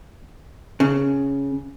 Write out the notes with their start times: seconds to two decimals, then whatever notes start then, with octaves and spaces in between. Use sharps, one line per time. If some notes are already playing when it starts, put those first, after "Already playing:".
0.80 C#3